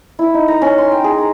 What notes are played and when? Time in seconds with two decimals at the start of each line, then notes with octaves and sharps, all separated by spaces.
0.19 E4
0.34 D#4
0.48 A#5
0.62 C#4
0.78 C6
0.92 G5
1.04 G#4
1.18 A#5